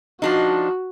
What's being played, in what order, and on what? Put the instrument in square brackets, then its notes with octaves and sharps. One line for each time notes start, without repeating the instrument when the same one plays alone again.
[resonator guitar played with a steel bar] F3 D4 D#4 [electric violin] F#4